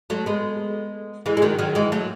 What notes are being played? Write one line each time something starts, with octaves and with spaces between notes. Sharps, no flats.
F#3 A3
G#3 B3
E3 G#3
G#3
D#3 F#3
D#3 F#3
E3 G#3
F#3 A3